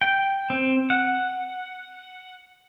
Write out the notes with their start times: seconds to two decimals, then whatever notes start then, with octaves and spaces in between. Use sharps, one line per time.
0.01 G5
0.50 C4
0.90 F#5